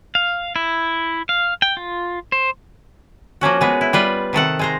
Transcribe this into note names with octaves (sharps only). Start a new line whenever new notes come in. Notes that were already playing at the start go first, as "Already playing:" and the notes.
F5
E4
F5
G5
F4
C5
F3 A#3 C#4 F#4
G#3 B3 G#4
E4
G3 F4 B4
C3 D#3 A4 F#5
G#3 C5 A#5